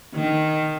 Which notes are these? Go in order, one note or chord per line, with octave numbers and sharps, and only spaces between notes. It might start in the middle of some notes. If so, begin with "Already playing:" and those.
D#3